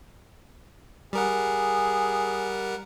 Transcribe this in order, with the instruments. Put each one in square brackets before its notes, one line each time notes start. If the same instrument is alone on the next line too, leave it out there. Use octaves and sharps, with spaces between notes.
[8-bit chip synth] G3 A#4 F#5 [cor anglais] G#4